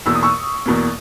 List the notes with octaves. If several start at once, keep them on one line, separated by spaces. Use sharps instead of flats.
E2 B2 A#3 E6
D#6
C#6 E6
E2 B2 A#3